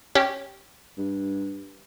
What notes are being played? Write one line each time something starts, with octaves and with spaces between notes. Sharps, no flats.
C#4 G4
G2